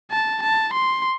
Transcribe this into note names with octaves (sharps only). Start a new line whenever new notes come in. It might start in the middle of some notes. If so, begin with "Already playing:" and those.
A5
A5
C6